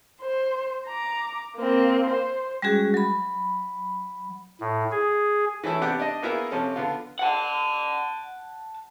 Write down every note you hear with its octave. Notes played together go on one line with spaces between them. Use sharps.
C5
A#5 D6
A#3 C4
C5
G3 G#3 C#4 F#4 G#4
F#3 B5
A2
G#4
E3 A3 C#4 E4
C3 B3 D4 G4 F#5 G5
D4 D#5
A#3 B3 E4 G#4 A#4
C3 F3 C#4 A4
D3 B3 F4
F#5 A5